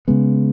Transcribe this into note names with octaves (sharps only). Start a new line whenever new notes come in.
C#3 G#3 B3